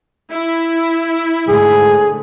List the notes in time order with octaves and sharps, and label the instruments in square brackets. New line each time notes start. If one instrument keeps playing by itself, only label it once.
[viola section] E4
[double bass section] G#2 D3 A3 [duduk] G#4